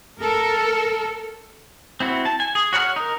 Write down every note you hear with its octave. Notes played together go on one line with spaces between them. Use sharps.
A4 A#4
C4 E4 F#4
A5
G#5
G#4
F#4 C#5 F#5 A#5 F6
D#4 A#4